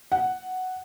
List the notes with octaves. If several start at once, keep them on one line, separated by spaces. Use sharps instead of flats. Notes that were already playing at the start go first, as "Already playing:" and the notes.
F#5